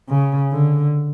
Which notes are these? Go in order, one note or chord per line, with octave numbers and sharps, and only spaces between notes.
C#3
D3